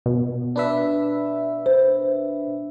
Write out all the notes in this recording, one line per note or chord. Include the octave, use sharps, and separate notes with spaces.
B2
D4 B4 E5
C5